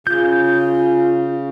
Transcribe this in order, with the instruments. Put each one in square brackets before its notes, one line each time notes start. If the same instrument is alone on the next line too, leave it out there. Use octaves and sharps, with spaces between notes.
[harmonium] C#3 [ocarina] F4 [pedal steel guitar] G6